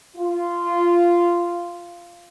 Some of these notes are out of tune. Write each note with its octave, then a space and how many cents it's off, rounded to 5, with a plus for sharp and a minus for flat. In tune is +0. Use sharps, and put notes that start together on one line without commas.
F4 -10